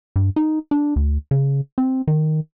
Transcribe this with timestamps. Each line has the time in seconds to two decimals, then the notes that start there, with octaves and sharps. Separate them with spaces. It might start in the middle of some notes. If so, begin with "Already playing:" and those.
0.16 G2
0.36 D#4
0.71 D4
0.96 D2
1.31 C#3
1.78 C4
2.08 D#3